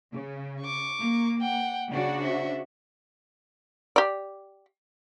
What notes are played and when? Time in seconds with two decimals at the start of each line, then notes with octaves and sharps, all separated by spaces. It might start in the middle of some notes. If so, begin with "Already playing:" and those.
0.14 C#3
0.61 C#6 D6
1.00 A#3
1.40 F#5 G5
1.92 C#3 D4 F#4 D5 F#5
2.21 C5 E5
3.96 G4 D5